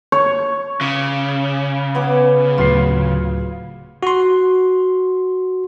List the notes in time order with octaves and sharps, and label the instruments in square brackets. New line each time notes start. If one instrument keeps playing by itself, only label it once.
[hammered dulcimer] C#5
[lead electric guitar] C#3 [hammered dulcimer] D6
[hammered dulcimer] B3 G#5 D6
[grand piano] D1 B4 C7 [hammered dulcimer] F4
[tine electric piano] F#4 C6